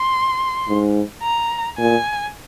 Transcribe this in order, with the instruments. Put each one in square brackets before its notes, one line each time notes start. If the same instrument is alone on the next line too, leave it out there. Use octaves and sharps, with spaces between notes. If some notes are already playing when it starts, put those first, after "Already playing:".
Already playing: [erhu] C6
[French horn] G#2
[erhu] A#5
[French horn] A#2 [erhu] G#5